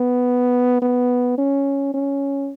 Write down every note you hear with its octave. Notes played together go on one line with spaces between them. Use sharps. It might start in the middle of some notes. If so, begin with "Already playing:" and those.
Already playing: B3
B3
C#4
C#4